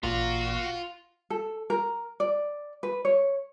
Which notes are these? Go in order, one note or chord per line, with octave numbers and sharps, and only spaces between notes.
A1 A#2 F4 F#4
A4
A#4
D5
B4
C#5